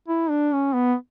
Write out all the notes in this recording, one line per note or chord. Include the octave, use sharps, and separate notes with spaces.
E4
D4
C#4
B3